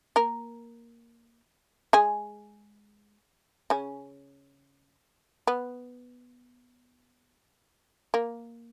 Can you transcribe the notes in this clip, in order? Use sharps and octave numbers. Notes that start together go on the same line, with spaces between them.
A#3 A#4
G#3 G#4
C#3 C#4
B3
A#3